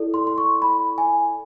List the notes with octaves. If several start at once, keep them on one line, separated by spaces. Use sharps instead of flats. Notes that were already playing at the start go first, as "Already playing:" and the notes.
Already playing: E4 A4 D5
C6
C6
C#6
B5
G#5